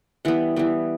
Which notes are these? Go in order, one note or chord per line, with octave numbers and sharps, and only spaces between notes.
E3 G3 B3 F#5
E3 G3 B3